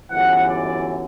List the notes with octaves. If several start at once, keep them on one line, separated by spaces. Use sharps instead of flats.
G1 F#2 E3 F#5
D5